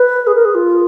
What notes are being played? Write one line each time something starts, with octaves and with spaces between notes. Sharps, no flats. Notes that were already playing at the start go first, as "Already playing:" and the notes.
Already playing: B4
G#4
A#4
G#4
F4